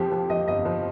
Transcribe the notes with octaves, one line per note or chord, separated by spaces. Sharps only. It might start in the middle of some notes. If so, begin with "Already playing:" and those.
Already playing: F2 F3 G4
F3
F3 D#5
G1 D#5
F3